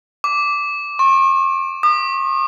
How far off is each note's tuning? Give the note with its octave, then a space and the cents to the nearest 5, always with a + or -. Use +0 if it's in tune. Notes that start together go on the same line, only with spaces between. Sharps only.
D6 -10
C#6 -45
D#6 -40